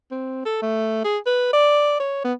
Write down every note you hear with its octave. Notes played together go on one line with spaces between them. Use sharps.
C4
A4
A3
G#4
B4
D5
C#5
B3